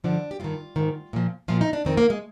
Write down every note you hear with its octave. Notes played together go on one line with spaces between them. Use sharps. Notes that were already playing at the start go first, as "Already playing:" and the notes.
G2 D3 F3 D4
G4
G2 D#3 F4
G#2 D#3
A#2 F3
A#2 F3 F4
D#4
D4
F2 D#3 C4
A#3
G#3